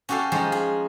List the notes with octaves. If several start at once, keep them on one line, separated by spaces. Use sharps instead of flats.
C#4 F#4 G4 A4 F5
F3 G#3 C#4 D#4 C5
G#4